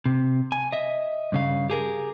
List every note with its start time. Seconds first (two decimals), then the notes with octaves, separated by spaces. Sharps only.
0.06 C3
0.52 G#5
0.72 D#5 E5
1.32 G2 C#3 F5
1.70 G4 G#4 A#4